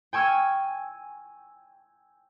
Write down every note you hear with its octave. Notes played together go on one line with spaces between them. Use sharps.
G5 G#5 C#6 E6 F6 G#6